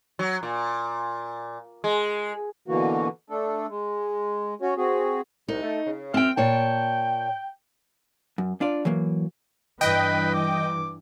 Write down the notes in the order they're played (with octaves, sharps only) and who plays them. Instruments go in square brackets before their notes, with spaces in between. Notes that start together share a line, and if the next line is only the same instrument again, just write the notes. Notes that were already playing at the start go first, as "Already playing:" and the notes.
[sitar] F#3
A#2
G#3
[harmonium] B2 D3 E3 A#3 F#4
A3 D4 A4
G#3
C#4 F#4 C#5
C4 F#4 G#4
[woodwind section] C2 [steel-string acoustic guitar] D#4
[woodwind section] A3
C#3
[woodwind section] F#2 E5 F6 [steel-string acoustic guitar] C4 G5
[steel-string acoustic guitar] A#2 C#5 A5 [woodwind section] G5
[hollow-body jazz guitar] F#2
D4 F4 D5
E3 F#3 A#3
[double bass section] G2 E3 [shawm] B4 [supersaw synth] D#5 G5
[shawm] D6